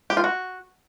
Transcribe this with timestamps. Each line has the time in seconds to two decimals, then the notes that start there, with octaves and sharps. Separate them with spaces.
0.10 G4
0.17 F4
0.24 F#4